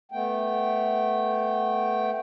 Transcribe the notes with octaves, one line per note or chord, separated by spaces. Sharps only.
A3 B3 G5